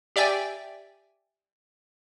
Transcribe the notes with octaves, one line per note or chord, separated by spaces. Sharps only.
G4 D5 E5 G5 G#5